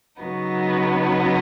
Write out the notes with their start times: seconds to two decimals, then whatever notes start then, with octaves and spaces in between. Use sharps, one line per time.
0.22 C#3 F#3 B3 D#4